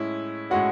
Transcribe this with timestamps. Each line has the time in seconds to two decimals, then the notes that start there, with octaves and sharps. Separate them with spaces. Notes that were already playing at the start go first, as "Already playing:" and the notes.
Already playing: A2 G#3 C#4 E4
0.50 A2 G#3 C#4 F#4 F#5